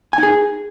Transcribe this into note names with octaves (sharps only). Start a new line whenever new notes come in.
D#4 G#4 G#5